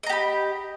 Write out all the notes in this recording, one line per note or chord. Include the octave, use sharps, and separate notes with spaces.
G4 D#5 A#5 B5